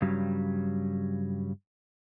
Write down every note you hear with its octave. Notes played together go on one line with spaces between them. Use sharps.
G2 C#3 F#3 G3